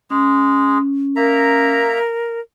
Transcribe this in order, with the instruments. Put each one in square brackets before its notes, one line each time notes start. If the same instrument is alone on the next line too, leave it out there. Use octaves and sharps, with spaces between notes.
[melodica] G#3 G#4 [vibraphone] C#4
[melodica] A#3 E5 A#5 [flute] A#4